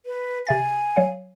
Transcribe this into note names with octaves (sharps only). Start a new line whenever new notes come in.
B4
C3 E5 G#5 A6
F#3 C#5 F5